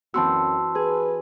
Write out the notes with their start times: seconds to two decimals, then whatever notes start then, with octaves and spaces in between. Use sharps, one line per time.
0.14 F#2 E3 C4 F#4 A5 C6 E6
0.75 G#4 B4